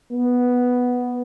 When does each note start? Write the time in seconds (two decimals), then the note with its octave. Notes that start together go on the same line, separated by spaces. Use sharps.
0.13 B3